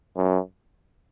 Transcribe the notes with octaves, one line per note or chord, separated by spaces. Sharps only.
F#2